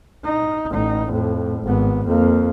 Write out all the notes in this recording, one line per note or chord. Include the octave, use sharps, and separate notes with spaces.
D#4
A1 D#4
F2 A2
G#1 B3
F2 A#3